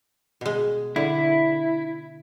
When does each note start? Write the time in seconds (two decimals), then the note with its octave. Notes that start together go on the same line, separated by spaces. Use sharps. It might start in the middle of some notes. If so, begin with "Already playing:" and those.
0.41 B2 G#3
0.96 D3 E4